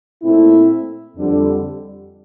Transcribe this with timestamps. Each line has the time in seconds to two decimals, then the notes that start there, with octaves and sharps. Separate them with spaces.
0.22 A#2 A3 C4 E4
1.16 F2 D3 G3